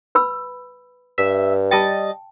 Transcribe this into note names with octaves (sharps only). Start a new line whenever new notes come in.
B4 B5 E6
G2 E5
G3 D#5 G5 A5 A6